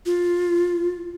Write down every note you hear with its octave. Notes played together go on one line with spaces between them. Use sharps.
F4